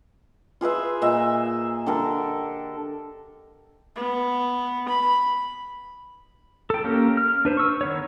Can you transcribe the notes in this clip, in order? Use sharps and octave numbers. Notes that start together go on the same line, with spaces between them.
F4 G#4 B4 E5
A#2 D#5 E5
D3 G4 A4 A#4
B3
B5
A4 G5
A#3 C#4 G4 A#4
F6
D4 B4 C5
C#6 E6
D#3 B3 C#5